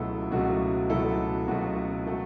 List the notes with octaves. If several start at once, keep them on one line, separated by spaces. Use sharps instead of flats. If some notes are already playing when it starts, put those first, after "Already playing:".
Already playing: C#2 B2 F#3 A3 E4 A4
C#2 B2 F#3 A3 F#4
C#2 B2 F#3 A3 E4 A4
C#2 B2 F#3 A3 F#4
F#3 A3